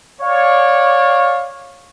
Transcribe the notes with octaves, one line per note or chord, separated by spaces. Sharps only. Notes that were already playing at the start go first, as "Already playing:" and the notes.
C#5 D5 F5